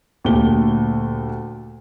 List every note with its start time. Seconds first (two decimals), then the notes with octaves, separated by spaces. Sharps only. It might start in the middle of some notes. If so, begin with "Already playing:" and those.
0.25 D2 A#2 G4 G7